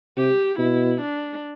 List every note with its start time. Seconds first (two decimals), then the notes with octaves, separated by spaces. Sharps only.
0.17 C3 G4
0.58 B2 E4
1.01 D4